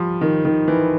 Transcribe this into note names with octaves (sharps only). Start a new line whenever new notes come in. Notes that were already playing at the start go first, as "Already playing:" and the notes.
Already playing: F3 G3
D#3
D#3
E3